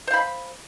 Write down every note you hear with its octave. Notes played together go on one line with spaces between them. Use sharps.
C5 F5 B5